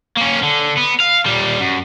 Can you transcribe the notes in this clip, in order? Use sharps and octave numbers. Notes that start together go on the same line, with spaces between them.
A#3 C#4
D3
B3
F5
A#2 G3
F#2